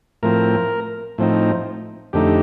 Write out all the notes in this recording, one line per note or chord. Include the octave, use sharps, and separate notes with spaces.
A2 F3 C4 A#4
A2 F3 C4 D#4
F2 D3 A3 D#4 G4